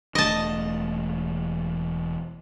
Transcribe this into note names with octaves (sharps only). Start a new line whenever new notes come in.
E1 A3 D4 D#5 A5